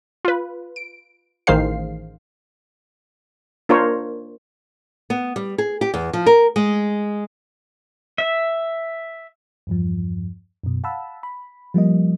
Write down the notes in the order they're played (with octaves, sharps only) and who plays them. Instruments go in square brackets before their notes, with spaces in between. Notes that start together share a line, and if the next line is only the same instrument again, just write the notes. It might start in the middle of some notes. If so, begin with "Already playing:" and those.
[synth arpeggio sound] F4 B4
D7
A1 D#3 G#4 C5 F5 C7
[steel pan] A#3 D4 F4 A#4 C5 C#5
[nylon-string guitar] B3
G3
G#4
G4
E2
F3
A#4
G#3
[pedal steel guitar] E5
[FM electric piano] E2 G2 F3
F#2 B2
F5 F#5 A5 B5 E6
B5
F3 G3 A#3 D#5